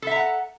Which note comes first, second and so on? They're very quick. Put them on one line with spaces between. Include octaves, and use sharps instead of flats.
A4 E5 A#5 F#5